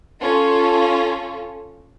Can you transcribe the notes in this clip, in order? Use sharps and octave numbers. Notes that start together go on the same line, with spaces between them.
C#4 F4 A4